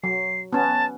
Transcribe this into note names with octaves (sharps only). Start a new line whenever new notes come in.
F#3 C7
B3 C#4 A5